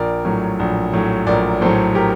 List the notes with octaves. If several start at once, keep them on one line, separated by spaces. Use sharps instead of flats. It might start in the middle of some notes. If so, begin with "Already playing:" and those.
Already playing: A#1 A#4 D5
A2 F#3
A#1
A2 F#3
A#1 A#4 D5
A2 F#3 A4 C5
G4 A#4